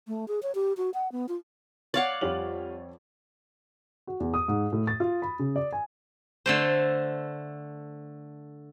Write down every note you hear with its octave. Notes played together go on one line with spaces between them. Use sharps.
A3
G#4
C#5
G4
F#4
F#5
B3
F4
C#5 D5 F5 F#5 A6
F2 G3 F4 C#5 F#7
F#4
E2
D#6
G#2
A2
A6
F4
B5
C#3
D5
G#5
D3 A3 C5